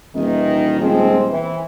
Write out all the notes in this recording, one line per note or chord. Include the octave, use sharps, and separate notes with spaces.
D#1 D#3 E3 D#4
F3 G#3 C4
E3 C4